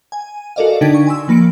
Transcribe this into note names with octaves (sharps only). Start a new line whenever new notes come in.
G#5
F#4 A4 A#4 D5 D#5 F5
D3 D4 D#4 G5 G#6 B6
C#6
G#5 C6 E6
F3 A#3 B5 C#7 D7